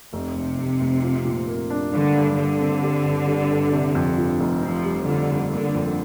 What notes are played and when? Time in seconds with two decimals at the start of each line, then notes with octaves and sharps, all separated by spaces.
0.13 F1 C3
0.36 F1
0.58 F1
0.81 F1
1.03 F4
1.25 A#2
1.48 A#3
1.70 D4
1.93 G2 D3
2.15 G2
2.37 G2 D3
2.61 C4
2.83 G3
3.05 G1
3.27 G3
3.50 G1
3.72 C3
3.95 F2
4.18 F3
4.40 F1
4.62 F3 C4
4.85 G3
5.07 D3 F4
5.29 G2
5.52 D3 A#3
5.74 F2